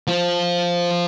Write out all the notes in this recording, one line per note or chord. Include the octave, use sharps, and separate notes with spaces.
F3